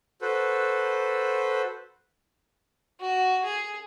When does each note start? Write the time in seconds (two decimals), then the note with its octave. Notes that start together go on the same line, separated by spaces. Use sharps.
0.22 F#4 A4 B4 C5
3.00 F#4
3.44 G#4